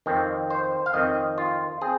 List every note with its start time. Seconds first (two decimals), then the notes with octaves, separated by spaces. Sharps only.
0.06 F2 D#3 C4
0.50 C5
0.86 F5
0.94 F2 D#3 C4 D#5
1.38 F4
1.82 C4 G#4